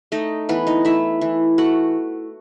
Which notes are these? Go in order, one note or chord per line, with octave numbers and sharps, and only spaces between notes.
A3 D#4 D#5
E3 B3 B4
D#4 D#5
A3 E4 E5
E3
A3 F#4 F#5